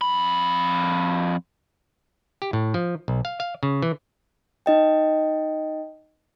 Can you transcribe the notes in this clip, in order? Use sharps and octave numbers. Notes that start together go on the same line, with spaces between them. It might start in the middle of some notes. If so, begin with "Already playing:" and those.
F2 B5
G4
A2
F3
B1
F5
F5
C#3
E3
D#4 D#5 G5